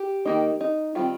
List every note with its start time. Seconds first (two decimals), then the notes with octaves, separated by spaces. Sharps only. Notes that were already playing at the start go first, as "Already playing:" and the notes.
Already playing: G4
0.25 D#3 A#3 D#4
0.61 D#4
0.95 D#3 G3 C4 F4